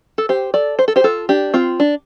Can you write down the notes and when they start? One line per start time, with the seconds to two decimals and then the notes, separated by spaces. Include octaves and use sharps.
0.18 A4
0.29 G4 C5
0.54 A4 D5
0.79 C5
0.88 A4
0.96 G4 C5
1.04 F4 A4
1.29 D4 G4
1.54 C4 F4
1.80 D4